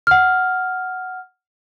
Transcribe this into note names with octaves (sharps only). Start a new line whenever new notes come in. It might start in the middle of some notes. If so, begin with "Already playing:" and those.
F#5 F6